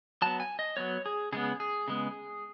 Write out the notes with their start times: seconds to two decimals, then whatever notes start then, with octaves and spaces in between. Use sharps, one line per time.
0.22 F#3 B3 A5
0.40 G#5
0.59 D#5
0.77 F#3 B3 C#5
1.06 G#4
1.32 C#3 G#3 B3 G#4
1.60 G#4
1.88 C#3 G#3 B3